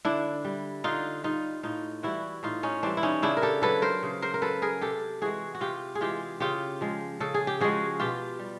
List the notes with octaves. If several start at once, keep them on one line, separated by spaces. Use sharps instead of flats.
D3 D4 E4
G3
D3 D#4 F4
G3 D#4 F4
A2 D#4 F4
E3 G3 E4 F#4
A2 D#4 F4
C#4 D#4
E3 G3 C4 D4
E4
C#4 D#4
C#3 D4 E4
A#4
G4 A4
F#3 A4 B4
A#4 C5
C#3
A#4 C5
A#4
F#3 A4 B4
G#4 A#4
C3 G4 A4
E3 G#3 F#4 G#4
F#4
C3 F4 G4
G#4
E3 G#3 F4 G4
C#3 F4 G4
F3 G#3
C#3 A4
G#4
G4
F3 G#3 F#4 G#4
B2 F4 G4
G3